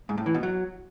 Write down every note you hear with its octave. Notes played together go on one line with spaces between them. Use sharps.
G#2
A2
E3
B2
F#3